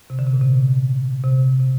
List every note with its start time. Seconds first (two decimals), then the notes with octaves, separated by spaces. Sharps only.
0.10 C3
0.19 D3
0.27 C3
0.33 A#2
0.41 C3
1.24 C3
1.60 C3